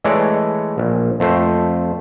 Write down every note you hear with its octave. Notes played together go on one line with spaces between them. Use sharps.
E3 G#3 A3 C#5 D5
A#1
F2 A3 C5